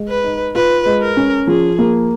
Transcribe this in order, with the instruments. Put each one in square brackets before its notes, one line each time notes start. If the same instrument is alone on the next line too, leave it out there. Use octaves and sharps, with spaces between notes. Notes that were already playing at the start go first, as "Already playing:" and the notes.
Already playing: [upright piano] G#3
[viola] B4
[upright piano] D#4
[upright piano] F4 [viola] B4
[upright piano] G#3
[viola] A#4
[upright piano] C#4
[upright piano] F3 [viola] G#4
[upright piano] A#3